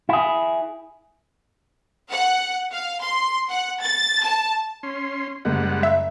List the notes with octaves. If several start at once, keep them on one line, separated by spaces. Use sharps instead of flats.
E4 G#4
F#5
F5
C6
F#5
A6
A5
C#4 C6
F#1 G3 G#3 F#5
E5